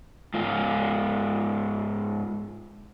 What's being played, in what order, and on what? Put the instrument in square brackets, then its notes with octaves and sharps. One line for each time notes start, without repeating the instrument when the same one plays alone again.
[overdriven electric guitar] G#2 F4